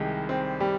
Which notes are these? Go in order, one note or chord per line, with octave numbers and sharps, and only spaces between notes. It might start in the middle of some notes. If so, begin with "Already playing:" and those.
Already playing: C2 C3 D#3 G#3
C4
G3